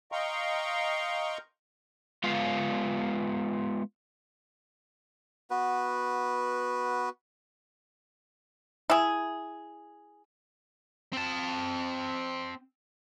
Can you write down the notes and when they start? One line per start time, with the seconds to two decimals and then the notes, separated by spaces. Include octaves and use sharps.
0.12 D#5 F5 G5 A#5 C6 C#6
2.24 G#3 B3 F4 F5
5.50 B3 F#4 B4
8.90 E4 G#4
11.13 C4 A5